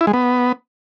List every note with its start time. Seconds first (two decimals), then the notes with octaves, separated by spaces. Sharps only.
0.01 E4
0.07 G#3
0.13 B3